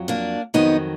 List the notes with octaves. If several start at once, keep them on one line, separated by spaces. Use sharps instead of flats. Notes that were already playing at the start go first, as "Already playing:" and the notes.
Already playing: F2 F#3
A#3 D4
F2 D#3 F#3 B3 D#4